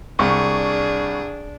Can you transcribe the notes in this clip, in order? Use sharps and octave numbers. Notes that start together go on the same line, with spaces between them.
C2 D4 G#4 C#6